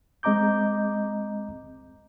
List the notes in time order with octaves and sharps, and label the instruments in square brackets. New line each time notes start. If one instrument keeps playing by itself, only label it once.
[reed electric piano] G#3 C4 D#5 A#5 D6 G6